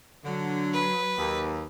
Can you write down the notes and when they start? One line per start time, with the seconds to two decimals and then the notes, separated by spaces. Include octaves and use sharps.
0.25 D3 F#3
0.73 B4
1.18 D#2